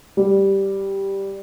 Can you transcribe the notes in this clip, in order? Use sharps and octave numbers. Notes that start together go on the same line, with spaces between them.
G3